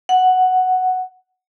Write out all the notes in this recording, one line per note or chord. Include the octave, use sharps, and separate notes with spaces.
F#5